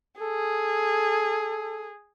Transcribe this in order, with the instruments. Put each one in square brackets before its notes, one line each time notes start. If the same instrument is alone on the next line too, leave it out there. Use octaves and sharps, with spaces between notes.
[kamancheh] G#4 [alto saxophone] A4